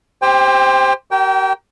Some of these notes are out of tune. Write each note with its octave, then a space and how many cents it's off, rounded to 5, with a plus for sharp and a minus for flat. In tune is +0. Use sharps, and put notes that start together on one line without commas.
G4 +0 C5 +0 G5 +30
G4 -45 A#4 +0 G5 -15